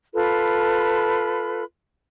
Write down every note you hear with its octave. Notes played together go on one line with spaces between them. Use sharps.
F4 A4 B4 B5